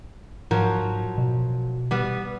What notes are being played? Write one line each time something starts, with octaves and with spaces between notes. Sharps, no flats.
G#2 F3 F#3 A#4
B2
G3 B3